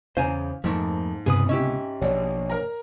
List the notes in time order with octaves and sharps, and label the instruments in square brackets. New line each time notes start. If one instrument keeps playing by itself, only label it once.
[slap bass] E2 [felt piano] C#3 [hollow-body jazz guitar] C5 G#5 A#5 [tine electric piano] F5
[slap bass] F2 [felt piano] G#2 [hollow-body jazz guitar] F3 A3 A#3
[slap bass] C#2 C3 B3 [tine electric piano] G2 D#6 [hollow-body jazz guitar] G#4 B4
[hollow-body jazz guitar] C#4 E4 G4 [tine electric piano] D#5
[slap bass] A#1 B2 [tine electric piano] C#5 D5
[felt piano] A#4 A#5